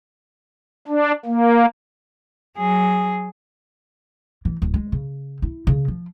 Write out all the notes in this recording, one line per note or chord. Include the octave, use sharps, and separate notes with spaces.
D4
A#3
F#3 G#4
E3
D1
G#3
C#3
E4
C#3
F3